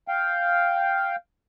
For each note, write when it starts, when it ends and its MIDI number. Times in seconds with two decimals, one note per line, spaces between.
0.08 1.16 77
0.08 1.16 79